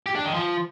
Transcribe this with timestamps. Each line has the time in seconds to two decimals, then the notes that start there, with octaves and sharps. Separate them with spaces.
0.06 G4
0.16 D4
0.25 D#3
0.34 F3